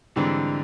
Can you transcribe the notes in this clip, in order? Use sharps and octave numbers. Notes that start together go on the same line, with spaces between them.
G#2 D3 E3 G3 C4